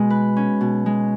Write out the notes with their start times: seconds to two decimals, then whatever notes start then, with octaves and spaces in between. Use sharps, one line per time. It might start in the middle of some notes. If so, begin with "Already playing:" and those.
Already playing: B2 G#3
0.10 B4
0.37 C#4
0.61 B2
0.86 G#3